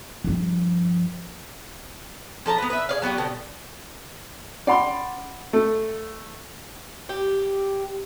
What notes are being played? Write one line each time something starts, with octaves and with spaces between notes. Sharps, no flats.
G2 F3
F3 A4 A5 A#5
B3 B4
B4 E5
G#4 D5 F5
F#3 B3 F#4 G4
B2 D3 C4
C#4 D5 F#5 B5 C6
A3
G4